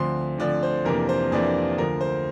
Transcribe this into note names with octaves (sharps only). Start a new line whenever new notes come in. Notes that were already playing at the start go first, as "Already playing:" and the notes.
Already playing: D2 D3 F3 C4 C6
D2 D3 F3 C4 D5
C5
F2 C3 E3 A#3 D4 A#4
C5
F2 C3 E3 A#3 D4 D5
D2 D3 F3 A#4
C5